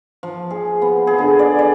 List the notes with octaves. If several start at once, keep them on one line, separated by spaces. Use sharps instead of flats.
F3
G#4
B3
G#4
D3
D5
D5